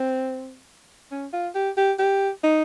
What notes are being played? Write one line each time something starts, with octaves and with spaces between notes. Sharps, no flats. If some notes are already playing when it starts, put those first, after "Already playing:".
Already playing: C4
C#4
F4
G4
G4
G4
D#4